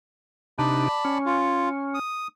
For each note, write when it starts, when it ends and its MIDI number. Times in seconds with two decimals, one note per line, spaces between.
0.59 0.88 48
0.59 0.88 62
0.59 0.88 63
0.59 1.18 74
0.59 1.18 81
0.59 1.18 83
1.05 1.99 61
1.26 1.69 65
1.94 2.27 87